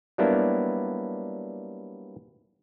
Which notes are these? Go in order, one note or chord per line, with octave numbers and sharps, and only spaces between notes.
F#3 G3 A#3 B3 D4 E4